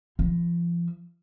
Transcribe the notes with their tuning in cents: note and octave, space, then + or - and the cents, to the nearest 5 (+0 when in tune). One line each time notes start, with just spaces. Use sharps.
F3 -35